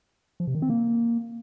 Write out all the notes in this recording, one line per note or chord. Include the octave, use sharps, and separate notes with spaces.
F3
C3
D#3
C4
A#3